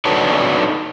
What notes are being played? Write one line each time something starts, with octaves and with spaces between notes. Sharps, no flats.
D4 D#4 F#4 A4 B4 C#5